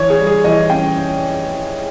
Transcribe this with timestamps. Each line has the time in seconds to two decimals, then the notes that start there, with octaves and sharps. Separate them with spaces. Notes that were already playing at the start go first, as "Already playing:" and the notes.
Already playing: E3 C#5
0.10 G#4
0.19 G3
0.27 G#4
0.44 E3 D#5
0.70 C#4 G5